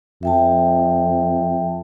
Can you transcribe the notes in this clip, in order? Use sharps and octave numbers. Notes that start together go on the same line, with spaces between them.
F2 E5 G5 A5